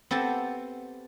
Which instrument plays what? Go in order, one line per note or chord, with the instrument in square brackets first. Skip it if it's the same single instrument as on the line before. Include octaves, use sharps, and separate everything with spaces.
[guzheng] B3 C4 G4 A4 A5